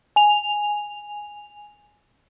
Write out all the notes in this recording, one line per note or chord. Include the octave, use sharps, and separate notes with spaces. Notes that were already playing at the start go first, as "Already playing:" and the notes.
G#5 F7